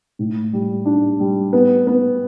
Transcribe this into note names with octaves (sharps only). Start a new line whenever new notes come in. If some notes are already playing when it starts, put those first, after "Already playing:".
A2
G3
D4
G3
B3
B3